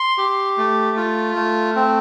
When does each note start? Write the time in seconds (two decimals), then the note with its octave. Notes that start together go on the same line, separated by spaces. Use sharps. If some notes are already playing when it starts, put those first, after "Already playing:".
Already playing: C6
0.18 G4
0.57 A3
0.97 F4
1.36 A3
1.76 C4